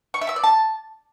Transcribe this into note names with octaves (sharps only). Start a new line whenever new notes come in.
C#6
E5
E6
D5
A5